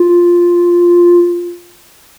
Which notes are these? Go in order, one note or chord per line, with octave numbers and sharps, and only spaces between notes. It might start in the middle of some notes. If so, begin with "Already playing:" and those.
Already playing: F4